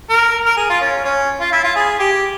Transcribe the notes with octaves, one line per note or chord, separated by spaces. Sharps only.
A#4
A#4
G#4
F4
C#4
C#4
F4
E4
F4
G#4
G4